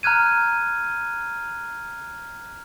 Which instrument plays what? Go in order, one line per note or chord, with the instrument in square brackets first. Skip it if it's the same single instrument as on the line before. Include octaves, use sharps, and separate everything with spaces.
[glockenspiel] A#5 F6 F#6 G#6 D#7